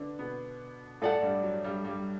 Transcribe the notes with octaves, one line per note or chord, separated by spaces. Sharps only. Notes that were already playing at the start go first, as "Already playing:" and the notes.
Already playing: D3 D4 B4
B2 B3
A2 A3 A4 D5 F#5
G2 G3
F#3
G2 G3
G2 G3